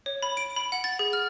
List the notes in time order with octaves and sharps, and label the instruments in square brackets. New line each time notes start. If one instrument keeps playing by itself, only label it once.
[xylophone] C#5
B5
D7
B5
F#5
A6
G#4
F6